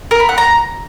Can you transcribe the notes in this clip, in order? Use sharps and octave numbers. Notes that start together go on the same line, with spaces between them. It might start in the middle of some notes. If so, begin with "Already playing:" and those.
A#4
B5
F#5
A#5